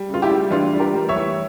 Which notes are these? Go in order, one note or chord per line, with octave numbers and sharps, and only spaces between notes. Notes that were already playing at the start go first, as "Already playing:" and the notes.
Already playing: G3
C#3
F4
E4 G4
G3
E3 D4 F4
G3
G4 A#4
G3
C#5 E5
E3